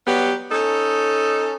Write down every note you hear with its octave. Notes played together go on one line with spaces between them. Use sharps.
F#3 G3 B3 G4
C#4 D#4 A4